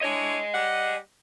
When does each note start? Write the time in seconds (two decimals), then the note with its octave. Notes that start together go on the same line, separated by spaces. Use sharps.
0.01 D4 E4 C#5 D#5 G#5
0.53 G3 D5 F#5